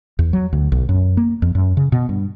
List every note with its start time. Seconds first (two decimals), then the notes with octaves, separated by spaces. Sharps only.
0.19 E2
0.33 F#3
0.53 D2
0.72 B1
0.89 F#2
1.17 A#3
1.42 F2
1.55 F#2
1.77 C#3
1.92 B2
2.09 G2